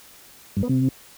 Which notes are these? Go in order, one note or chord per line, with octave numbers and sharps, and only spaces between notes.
G2
B3
C3